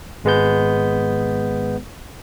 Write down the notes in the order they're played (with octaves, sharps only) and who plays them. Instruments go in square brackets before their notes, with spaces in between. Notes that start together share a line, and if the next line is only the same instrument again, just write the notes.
[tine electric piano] G#1 G#3 B3 G6